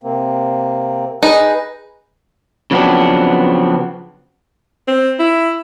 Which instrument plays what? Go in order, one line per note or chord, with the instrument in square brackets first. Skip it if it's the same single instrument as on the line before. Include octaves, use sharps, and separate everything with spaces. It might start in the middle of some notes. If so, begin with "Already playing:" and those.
[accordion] C3 A#3 C4
[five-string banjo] D#4 [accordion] G#4 B4
[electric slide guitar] C#3 F3 F#3 B3 C4 D4
[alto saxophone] C4
E4